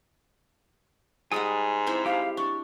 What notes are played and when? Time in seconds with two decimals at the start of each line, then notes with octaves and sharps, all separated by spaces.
1.32 G#2 G3 G#3 F#5 G#5 D#6
1.87 C4 E4 C5
2.06 G4 F5
2.37 D4 C#6